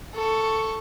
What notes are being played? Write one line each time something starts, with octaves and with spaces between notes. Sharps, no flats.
A4 C#6